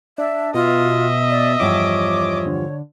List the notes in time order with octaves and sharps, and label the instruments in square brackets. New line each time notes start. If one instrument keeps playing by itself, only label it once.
[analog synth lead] D4 [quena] E5
[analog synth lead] B2 [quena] F4 [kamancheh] D#5 E5
[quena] D5
[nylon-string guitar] E2 G2 F3 [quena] C#5 [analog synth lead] D6
[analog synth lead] D3